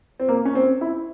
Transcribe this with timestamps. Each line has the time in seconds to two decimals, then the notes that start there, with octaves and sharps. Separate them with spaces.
0.20 C4
0.29 A#3
0.45 C#4
0.55 C4
0.81 E4